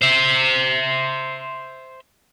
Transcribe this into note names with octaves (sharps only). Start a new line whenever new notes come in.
C5 E5